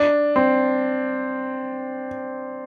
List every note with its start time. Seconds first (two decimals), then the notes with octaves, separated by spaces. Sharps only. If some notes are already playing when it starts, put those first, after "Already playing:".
Already playing: D4
0.36 C4